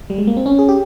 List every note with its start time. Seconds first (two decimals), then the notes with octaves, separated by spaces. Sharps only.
0.10 G3
0.18 G#3
0.27 A#3
0.37 C4
0.46 C#4
0.59 G#4
0.69 G4